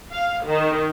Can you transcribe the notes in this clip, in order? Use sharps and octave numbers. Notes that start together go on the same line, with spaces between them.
F5
D#3